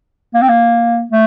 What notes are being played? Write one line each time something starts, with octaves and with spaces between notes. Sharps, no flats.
A#3
C4
A#3
A3